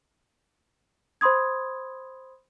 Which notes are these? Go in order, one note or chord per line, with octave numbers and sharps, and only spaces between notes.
C5 B5 C6 D#6 G#6